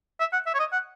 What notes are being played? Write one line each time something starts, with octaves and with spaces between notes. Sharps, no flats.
E5
F#5
E5
C#5
D#5
F#5